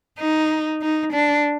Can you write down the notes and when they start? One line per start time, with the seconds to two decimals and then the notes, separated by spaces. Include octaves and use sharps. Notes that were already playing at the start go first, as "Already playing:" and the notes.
0.19 D#4
0.82 D#4
1.13 D4